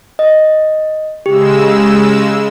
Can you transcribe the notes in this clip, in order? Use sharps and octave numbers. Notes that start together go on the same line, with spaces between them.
D#5
C#3 G#3 G4 E6